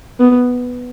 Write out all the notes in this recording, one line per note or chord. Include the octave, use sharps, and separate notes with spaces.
B3